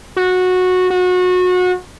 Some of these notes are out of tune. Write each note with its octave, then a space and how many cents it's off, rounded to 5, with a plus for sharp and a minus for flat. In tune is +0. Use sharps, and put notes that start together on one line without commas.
F#4 -15
F#4 -30